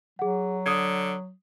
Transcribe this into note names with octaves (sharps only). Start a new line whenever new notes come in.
F#3 G#4 F#5
D3 D#6 G#6